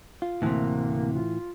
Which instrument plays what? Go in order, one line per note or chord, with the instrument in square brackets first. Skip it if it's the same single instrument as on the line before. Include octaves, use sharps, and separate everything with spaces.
[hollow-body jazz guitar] F4
[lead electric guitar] D2 C3 [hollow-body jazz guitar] A2 E3 [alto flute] A#3
[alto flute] F4